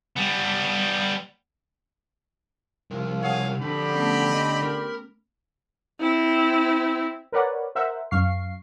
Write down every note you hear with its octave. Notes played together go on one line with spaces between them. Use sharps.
G3 B3
C2 F3 F4 A#4
G#4 C#5 F5 F#5
D3 F3 C4 D4 G4 B5
A3 B3 C#4
D#5
A#4
C4 E4
A#4 B4 C#5 D5 F#5
A#4 C5 E5 F#5
F#2 F5 C#6 C7